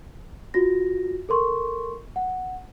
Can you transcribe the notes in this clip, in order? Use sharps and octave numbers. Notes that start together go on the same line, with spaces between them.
F4 F#4 A#6
A4 A#4 C6 C#6
F#5